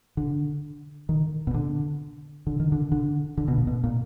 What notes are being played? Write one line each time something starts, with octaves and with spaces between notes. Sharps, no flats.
D3
D#3
B2
D3
D3
D#3
D3
D3
D3
B2
A#2
B2
A#2